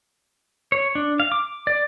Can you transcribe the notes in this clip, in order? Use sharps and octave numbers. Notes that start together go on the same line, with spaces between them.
C#5
D4
F5
D6
D5